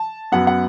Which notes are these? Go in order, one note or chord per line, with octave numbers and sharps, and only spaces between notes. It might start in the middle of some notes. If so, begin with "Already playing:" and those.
Already playing: A5
F#2 F#3 B3 F#5
F#5